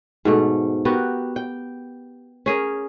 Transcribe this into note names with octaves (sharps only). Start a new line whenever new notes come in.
G#2 B2 A3
B3 F#4 G4 A#4
G5
C#4 G#4 A#4